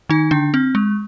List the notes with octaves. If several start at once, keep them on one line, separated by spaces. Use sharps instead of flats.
D#3 D#4
D3 D4
C4
G#3